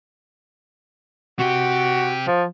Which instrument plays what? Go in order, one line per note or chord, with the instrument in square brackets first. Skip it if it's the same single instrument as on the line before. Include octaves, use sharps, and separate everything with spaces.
[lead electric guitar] C3 G4 [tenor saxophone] F#4
[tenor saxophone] F3